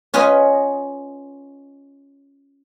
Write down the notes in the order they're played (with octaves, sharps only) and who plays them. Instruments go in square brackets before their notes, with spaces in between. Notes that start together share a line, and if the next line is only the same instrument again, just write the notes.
[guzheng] C#4 F4 B4 C#5 D#5